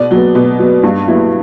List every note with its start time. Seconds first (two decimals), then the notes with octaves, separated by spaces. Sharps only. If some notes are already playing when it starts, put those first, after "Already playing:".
Already playing: B2 D5
0.11 F#3 B3
0.35 B2
0.59 F#3 B3
0.83 G2
1.07 F#3 B3 E4